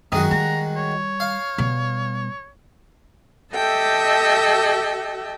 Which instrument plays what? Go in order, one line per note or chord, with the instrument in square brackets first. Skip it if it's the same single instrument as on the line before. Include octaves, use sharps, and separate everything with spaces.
[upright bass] F#2 [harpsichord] D#3 G#3 F#4 [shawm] D#6
[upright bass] G3 [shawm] A#5
[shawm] C#5
[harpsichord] F5
[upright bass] B2 G3
[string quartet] G4 A4 D#5 E5 G5 A5